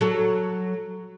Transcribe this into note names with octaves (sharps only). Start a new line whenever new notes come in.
F#3 A4